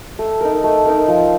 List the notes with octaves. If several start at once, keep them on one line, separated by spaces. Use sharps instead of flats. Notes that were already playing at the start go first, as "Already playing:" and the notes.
A3
D#4 A#4
A3
D#4 A#4
F3